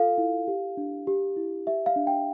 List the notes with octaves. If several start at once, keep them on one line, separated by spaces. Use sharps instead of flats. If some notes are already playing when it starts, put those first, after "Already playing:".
Already playing: F4 A4 F5
E4
G4
D4
G4
E4
G4 E5
F5
D4
G5